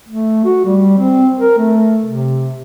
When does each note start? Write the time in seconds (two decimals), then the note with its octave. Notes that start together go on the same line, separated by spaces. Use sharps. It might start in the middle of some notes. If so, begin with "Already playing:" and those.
0.09 A3
0.45 F#4
0.65 G3
0.99 C4
1.39 A#4
1.58 A3
2.06 C3